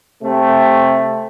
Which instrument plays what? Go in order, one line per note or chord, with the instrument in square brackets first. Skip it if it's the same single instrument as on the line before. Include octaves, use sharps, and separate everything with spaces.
[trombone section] C3 A3